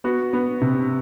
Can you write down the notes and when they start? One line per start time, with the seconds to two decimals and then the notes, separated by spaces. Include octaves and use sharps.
0.04 B3 F#4
0.33 B3
0.62 C3